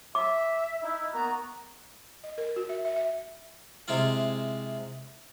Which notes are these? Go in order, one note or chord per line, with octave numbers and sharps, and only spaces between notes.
E5 D6
D#4 E4
A#3 B3 F#4 A#5
D#5
A#4
F#4
E5
E5
E5
C3 G#3 E4 F4 F5